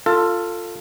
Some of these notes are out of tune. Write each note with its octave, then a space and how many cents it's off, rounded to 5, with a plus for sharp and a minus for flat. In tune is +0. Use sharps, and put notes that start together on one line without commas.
F4 +0 A4 +20